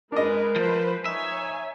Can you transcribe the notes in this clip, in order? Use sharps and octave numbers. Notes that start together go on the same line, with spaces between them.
G#3 D4 A#4 B4 D#5
F3 B4 C5
D#4 C#5 E5 G#5